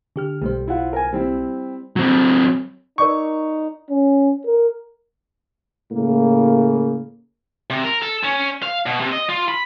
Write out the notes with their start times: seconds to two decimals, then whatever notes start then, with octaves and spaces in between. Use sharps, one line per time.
0.16 D3 G4 F6
0.42 B1 G3 A3 C5
0.68 E4 F4 F#5
0.93 A#4 G#5
1.13 G3 C4 E4
1.96 F#3 C4
2.98 D#4 A#4 D5 C#6 D6
3.90 C#4
4.46 A#4
5.92 A2 C#3 A#3
7.70 C3
7.84 A#4
8.02 A4
8.23 C#4
8.62 F5
8.86 B2
9.00 C3
9.12 D#5
9.29 F4
9.48 B5